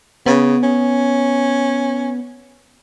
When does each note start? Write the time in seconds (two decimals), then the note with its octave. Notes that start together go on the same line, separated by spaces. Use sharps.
0.26 C#3 B3
0.63 C#4